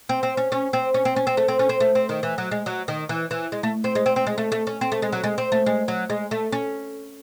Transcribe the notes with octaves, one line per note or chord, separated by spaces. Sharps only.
C4
C4
C#4
C#4
C4
C#4
C4
C#4
C4
A3
C4
C#4
C4
A3
C4
D#3
E3
F#3
G#3
F#3
D#3
E3
E3
G#3
A3
C4
G#3
C4
C4
G#3
A3
A3
C#4
C4
A3
G#3
F#3
G#3
C4
A3
G#3
F#3
G#3
A3
C#4